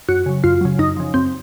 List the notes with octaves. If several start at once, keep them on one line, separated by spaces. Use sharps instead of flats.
F#2 F#4
C#3 F#3
F#2 F4
C#3 F#3
F#2 D#4
C#3 F3
F#2 C4